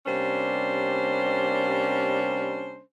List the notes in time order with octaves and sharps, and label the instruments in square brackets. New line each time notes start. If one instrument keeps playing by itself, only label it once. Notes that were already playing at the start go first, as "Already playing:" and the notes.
[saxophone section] C3 G3 A#3 C#4 D4 C5